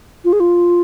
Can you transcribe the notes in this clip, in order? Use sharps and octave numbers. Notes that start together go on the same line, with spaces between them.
F4
G#4
F4